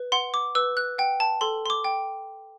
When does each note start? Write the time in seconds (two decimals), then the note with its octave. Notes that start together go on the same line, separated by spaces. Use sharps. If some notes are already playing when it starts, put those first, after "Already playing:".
Already playing: B4
0.12 F#5 C6
0.34 D6
0.55 B4 E6
0.77 F#6
0.98 F#5 G5
1.20 A5
1.41 A4 C6
1.66 C6
1.70 D6
1.84 G5